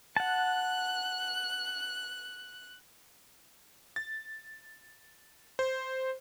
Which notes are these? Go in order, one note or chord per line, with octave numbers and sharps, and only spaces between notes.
F#5 A5 F#6
A6
C5